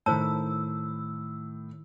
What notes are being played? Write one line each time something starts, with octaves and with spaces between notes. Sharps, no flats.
A2 D#3 E4 C5 A5 E6 G6